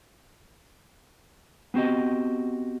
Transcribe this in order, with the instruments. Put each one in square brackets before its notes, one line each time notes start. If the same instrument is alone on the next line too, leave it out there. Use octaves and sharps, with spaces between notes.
[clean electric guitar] B3 C4 F#4 G4 D#5